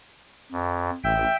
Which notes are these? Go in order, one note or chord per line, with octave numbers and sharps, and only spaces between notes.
F2
A1 E5 G5